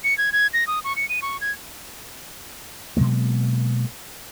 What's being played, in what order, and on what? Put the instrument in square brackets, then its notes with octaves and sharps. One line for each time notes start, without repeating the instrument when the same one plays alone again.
[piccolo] C#7
G#6
G#6
A#6
D#6
C#6
C#7
D#7
C#6
G#6
[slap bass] B2 F#3 G#3 A#3